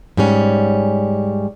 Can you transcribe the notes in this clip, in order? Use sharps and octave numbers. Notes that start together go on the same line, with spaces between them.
G#2 G3 C#4